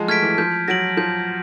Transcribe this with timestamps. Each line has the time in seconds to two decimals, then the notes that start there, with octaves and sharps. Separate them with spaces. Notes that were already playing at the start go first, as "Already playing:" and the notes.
Already playing: F3 F#3 G#3
0.08 A3 F6 G#6 B6 D7
0.22 E3
0.38 F3 G6
0.68 F#3 A#6 D7 F#7
0.97 F3 G6